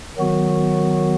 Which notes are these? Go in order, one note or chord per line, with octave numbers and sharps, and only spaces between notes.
D#3 F#3 B3 F#4